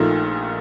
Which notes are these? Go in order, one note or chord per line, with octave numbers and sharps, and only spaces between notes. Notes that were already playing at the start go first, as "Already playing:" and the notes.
Already playing: A#1 A#2 A3 D#4